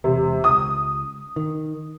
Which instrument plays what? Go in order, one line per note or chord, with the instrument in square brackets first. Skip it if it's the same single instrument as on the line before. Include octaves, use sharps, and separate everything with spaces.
[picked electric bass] E1 [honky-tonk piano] C3
[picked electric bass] C#2 [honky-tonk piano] D#6
[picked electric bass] D#3